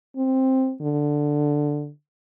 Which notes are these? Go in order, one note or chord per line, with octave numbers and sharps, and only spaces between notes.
C4
D3